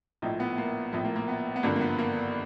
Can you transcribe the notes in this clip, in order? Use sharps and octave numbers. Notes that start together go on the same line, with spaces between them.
A#1 A2 F3 D#4
B3
A#3
A#1 A2 F3 B3
A#3
A#3
B3
B3
G#1 G2 D3 F3 A#3
A#3
B3
A#3